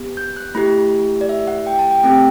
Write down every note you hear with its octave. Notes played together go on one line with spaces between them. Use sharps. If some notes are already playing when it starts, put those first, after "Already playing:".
Already playing: B3 G4
G6
F#6
A3 E4 G4 B5
D5
E5
F#5
G5
A5
G5
A3 C4 G4 G5